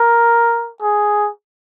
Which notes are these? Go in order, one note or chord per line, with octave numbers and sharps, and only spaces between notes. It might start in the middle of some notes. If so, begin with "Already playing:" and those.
Already playing: A#4
G#4